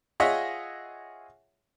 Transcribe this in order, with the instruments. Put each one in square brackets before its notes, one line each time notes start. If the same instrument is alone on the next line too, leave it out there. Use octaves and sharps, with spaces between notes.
[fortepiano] F4 G#4 C#5 D#5 E5 F#5